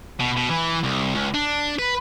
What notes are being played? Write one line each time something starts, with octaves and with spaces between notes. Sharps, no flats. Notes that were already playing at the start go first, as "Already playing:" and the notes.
B2
B2
E3
C2
C#2
D4
B4